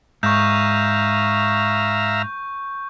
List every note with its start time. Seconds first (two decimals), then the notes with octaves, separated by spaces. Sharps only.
0.23 G#2 E5 F5 A#5 C#6 G6